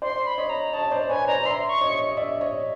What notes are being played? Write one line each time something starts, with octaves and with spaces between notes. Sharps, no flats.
C5 D5 C6
B5
C#5 D#5
A#5
C#5 D#5 A5
C5 D5
D5
B4 C#5 G#5
C5 D5 A#5
D5 E5 C6
C#6
C#5 D#5
D#5
D5 E5
C#5 D#5